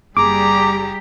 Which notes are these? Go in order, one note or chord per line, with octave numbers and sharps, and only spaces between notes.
F#1 G3 G4 G#4 A#5 D6